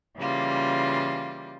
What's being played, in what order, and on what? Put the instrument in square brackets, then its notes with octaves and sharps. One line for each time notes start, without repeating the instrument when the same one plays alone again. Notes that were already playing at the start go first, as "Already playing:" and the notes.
[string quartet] C#3 E3 G3 A#3 F4